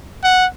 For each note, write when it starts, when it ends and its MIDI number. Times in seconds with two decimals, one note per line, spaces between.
0.24 0.46 78